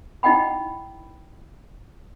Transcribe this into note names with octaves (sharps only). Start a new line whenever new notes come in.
D#4 E4 D#5 F#5 G5 B5